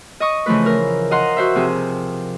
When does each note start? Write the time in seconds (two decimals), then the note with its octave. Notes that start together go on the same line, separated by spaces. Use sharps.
0.20 D#5 C#6 D#6
0.46 C#3 E3 F3 A3 B4
0.66 A#4
1.11 D#5 F5 F#5 A#5 C6 D#6
1.37 F#4 C5 E5
1.55 C3 F3 C4 G#4